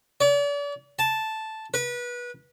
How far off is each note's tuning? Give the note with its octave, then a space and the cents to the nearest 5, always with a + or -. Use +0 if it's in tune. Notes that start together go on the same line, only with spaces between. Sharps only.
D5 -40
A5 -5
B4 -25